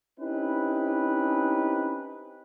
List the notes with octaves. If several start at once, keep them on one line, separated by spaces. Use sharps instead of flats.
C4 C#4 D#4 E4 G4 B4